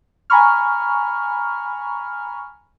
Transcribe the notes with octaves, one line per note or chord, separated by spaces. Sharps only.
G#5 A#5 B5 C#6 F6